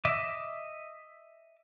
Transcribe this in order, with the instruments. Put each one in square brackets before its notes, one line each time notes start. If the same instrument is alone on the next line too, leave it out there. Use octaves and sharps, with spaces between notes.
[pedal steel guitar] D#5 E5 D6